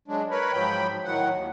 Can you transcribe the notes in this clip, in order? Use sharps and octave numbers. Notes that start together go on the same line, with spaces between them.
F#3 G#3 D4
A#4 B4 C#5 B5
G#2 F3 F#3 G5 B5
A2 D#3 F#3 F#5
D#2